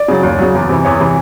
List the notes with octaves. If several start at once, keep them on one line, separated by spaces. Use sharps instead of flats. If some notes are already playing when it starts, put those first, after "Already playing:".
Already playing: D5
C#3 F#3
D#2
C#3 F#3
E2
C3 E3
E2 C#5
C3 E3